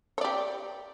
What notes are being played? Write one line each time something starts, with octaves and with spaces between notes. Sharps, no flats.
G4 C#5 D5